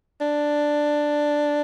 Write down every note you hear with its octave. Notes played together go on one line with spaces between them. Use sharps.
D4